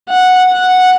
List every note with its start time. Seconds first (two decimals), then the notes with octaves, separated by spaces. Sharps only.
0.09 F#5
0.52 F#5